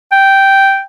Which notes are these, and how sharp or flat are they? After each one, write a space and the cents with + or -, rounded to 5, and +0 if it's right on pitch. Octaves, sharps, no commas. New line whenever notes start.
G5 -5